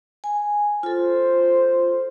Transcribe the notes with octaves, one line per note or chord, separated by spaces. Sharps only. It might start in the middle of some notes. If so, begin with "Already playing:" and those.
G#5
F4 A4 C5